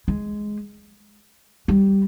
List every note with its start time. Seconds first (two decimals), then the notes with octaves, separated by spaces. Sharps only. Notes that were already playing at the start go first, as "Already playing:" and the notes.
0.08 G#3
1.68 G3